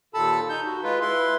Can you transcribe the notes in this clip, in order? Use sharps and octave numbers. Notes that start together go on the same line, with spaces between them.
D#2 A#2 A4 A5 B5 E6
D#4 G6
F#4
G#3 F4 B4
E4 B4 C6